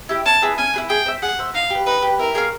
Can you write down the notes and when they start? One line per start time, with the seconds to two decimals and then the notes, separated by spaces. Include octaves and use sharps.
0.09 E4 G4
0.26 C#4 A5
0.42 E4 G#4 B4
0.58 C#4 G#5
0.74 E4 G#4 B4
0.90 G#4 G5
1.06 C5 E5
1.22 G#4 F#5
1.39 C5 E5
1.54 D#4 F5
1.70 G4 B4
1.86 D#4 B4
2.02 G4 B4
2.19 E4 A#4
2.35 G#4 C#5 F5